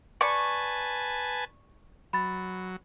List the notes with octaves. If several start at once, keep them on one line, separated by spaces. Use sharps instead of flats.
B4 D5 G#5 A5 C#6
F#3 B5 A6